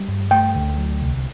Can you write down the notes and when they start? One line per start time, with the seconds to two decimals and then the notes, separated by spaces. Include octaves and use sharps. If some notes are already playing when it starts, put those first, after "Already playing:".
Already playing: G3
0.08 G2
0.31 A3 G5
0.55 D2
0.78 F#3
1.02 C2